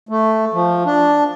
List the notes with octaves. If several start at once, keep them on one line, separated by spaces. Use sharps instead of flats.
A3
F3
D4